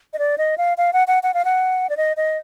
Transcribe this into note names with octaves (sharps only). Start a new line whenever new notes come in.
D#5
D5
D#5
F5
F5
F#5
F#5
F#5
F5
F#5
D5
D#5
D#5